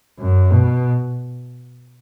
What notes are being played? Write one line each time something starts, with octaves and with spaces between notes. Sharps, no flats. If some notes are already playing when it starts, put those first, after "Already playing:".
F#2
B2